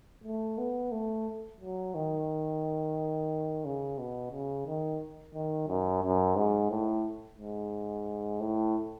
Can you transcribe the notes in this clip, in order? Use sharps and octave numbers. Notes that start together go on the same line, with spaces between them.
A3
B3
A3
F#3
D#3
C#3
B2
C#3
D#3
D#3
F#2
F#2
G#2
A2
G#2
A2